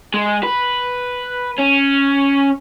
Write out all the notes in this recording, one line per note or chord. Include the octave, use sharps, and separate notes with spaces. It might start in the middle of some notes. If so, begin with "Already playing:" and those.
G#3
B4
C#4